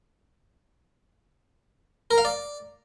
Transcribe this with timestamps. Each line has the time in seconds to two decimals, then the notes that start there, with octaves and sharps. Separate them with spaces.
2.11 A#4
2.18 F5
2.25 D5